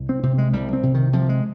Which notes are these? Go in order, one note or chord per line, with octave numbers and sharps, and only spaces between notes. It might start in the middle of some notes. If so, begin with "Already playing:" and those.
Already playing: C2
C4
C3 C4
G#3
C2 G3
C4
C3
D#3
C3 F3
G#3